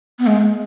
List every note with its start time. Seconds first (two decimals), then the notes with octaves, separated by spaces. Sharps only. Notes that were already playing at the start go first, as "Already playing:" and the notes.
0.19 B3
0.27 G#3